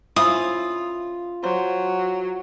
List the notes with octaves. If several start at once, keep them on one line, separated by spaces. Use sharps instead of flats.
C#3 C4 E4 F4 D#6
F#3 C5